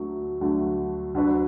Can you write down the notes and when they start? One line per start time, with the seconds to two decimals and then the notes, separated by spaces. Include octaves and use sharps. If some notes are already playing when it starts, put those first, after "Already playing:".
Already playing: D2 D3 F#3 A3
0.41 D2 D3 F#3 A3
1.14 D2 D3 F#3 D4 B4